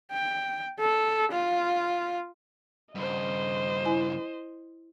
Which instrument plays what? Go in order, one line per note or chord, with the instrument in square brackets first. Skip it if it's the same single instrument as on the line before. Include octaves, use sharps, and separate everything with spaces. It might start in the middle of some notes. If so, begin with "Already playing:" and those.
[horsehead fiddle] G5
A4
F4
[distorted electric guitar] G2 C#3 [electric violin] C5 D#5
[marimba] E4 G#5